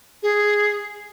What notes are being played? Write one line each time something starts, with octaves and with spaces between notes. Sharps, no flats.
G#4